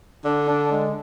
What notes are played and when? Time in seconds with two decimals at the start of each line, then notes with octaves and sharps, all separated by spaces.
0.25 D3 D4
0.48 D4
0.72 G#3